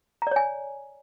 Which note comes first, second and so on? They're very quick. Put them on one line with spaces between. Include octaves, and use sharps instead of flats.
A#5 D5 C#5 G#5